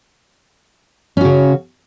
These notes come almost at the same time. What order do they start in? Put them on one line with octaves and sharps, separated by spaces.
C#4 F#4 C#3